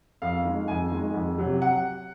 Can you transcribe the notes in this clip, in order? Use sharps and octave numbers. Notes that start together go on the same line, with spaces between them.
F2 F5
D#3 G#3
F2 G#5
D#3 G#3
F2
C3 F#3
F#5